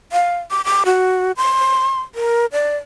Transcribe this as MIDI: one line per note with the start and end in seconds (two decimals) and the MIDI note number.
0.12 0.38 77
0.51 0.61 86
0.65 0.83 86
0.86 1.32 66
1.37 2.00 84
2.15 2.46 70
2.52 2.77 74